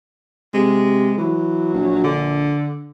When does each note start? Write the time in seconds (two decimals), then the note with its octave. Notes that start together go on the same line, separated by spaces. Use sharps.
0.54 C3 G#3
1.18 E3 F#3
1.74 A#1
2.04 D3